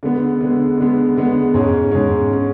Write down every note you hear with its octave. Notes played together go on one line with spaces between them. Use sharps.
D3 G#3 B3
D3 G#3 B3
D3 G#3 B3
D3 G#3 B3
G#2 G#3 C#4
G#2 G#3 C#4
G#3 C#4